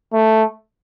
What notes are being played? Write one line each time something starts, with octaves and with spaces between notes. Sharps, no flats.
A3